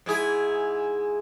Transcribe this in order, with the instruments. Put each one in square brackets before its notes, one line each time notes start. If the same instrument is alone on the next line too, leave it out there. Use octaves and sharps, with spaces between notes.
[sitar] G#2 E4 G#4